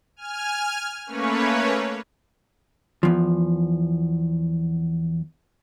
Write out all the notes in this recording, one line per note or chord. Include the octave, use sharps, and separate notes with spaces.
G#5 F6
A3 A#3 C#4 B4 C#5
E2 F3